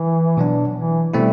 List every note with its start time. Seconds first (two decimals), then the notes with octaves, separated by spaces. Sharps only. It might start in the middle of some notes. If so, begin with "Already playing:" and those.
Already playing: E3
0.37 B2 F#3 B3 D4
0.75 E3
1.14 B2 G3 A3 C4 E4